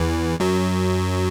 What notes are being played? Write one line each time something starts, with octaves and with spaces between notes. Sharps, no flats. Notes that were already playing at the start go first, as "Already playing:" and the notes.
Already playing: E2 E3
F#2 F#3